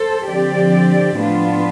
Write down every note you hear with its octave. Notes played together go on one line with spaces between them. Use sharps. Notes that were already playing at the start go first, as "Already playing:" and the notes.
Already playing: A4 C5
D3 F3 C4 G4 D5
A2 F3 B3 D4 F4